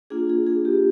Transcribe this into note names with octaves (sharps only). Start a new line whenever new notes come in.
A#3 D4 F4 G#4
G#4
G#4
G4